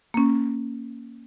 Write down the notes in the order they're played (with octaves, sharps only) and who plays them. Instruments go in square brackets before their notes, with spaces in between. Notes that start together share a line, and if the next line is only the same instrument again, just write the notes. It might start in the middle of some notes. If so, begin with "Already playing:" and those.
[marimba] A#3 C#4